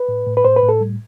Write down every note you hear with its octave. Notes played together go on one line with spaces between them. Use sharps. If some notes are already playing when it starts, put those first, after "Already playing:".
Already playing: B4
A2
A2
B4
A2 C5
B4
A2
A4
G3